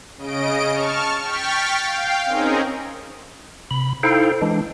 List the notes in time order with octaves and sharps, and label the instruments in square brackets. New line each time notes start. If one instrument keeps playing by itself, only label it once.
[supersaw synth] C#3 D#5 D7
A5 C#6 F6
G5 C#6 F6 A6 B6
F5 G5
C4 C#4 D#4 G#4 A#4
[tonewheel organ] C3 B5
D#4 E4 A4 C5 F5 G5
E3 G#3 D4